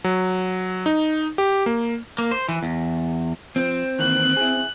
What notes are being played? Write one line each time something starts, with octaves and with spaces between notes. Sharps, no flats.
F#3
D#4
G4
A#3
A#3
C5
E3
E2
F3 C4
D#3 E3 A#3 F#6
E4 G#4